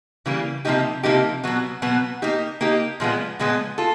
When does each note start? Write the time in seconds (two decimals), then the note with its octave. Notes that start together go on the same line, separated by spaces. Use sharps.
0.26 C#3 E3 G3 A#3
0.65 C3 F3 A#3 D#4 G4
1.03 C3 F3 A#3 D#4 G4
1.44 B2 F#3 B3
1.82 B2 F#3 B3
2.22 A#3 D#4 G4
2.61 A#3 D#4 G4
3.00 A#2 F3 G#3 B3
3.39 A#2 F3 G#3 B3
3.78 F4 A4